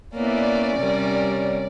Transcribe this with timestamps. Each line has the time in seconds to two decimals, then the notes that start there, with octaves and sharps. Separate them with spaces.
0.15 A#3 B3 C#4 E4 D5
0.78 C3 G3 A#4